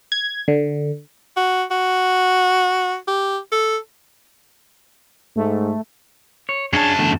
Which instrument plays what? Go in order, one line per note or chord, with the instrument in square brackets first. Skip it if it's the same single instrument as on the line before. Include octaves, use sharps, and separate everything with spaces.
[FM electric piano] G#6
D3
[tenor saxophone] F#4
F#4
G4
A4
[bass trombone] G#2 [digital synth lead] A3
[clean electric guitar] C#5
[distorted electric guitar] F#2 A5 [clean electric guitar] D4 G#4 C#5
[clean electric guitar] E2 D3 A3